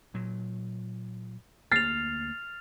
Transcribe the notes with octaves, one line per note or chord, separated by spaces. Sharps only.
A#2 F#3
D2 A#3 F6 A6 C7 F7